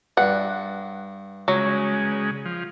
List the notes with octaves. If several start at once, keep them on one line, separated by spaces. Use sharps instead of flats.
G2 F#5
C#3 F#3 G#3
F3